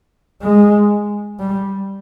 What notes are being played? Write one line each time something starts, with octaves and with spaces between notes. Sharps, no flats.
G#3
G3